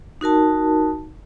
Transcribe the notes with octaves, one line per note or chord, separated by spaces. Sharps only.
D#4 F#4 A#4 A5